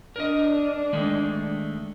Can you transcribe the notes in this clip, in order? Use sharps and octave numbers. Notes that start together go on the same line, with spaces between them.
D4 A#4 D#5
D#3 G#3 A3